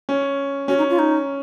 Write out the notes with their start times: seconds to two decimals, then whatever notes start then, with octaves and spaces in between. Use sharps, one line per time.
0.09 C#4
0.68 C#4 F#4
0.78 D#4
0.90 F4
0.99 D#4